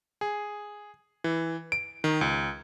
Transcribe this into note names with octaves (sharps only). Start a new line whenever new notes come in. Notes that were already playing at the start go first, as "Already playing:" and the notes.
G#4
E3
D7
D#3
C#2